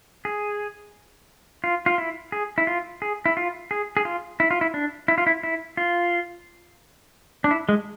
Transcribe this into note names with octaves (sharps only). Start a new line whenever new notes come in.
G#4
F4
F4
E4
G#4
E4
F4
G#4
E4
F4
G#4
G#4
F4
E4
F4
E4
D4
E4
F4
E4
E4
F4
D4
E4
G#3